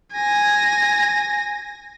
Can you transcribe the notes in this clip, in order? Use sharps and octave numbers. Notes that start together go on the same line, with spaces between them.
G#5 A#6